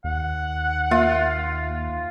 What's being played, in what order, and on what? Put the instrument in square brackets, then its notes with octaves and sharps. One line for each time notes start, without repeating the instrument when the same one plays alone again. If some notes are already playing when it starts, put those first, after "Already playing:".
[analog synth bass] D#2 [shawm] F#5
[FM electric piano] A#3 E5 [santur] F4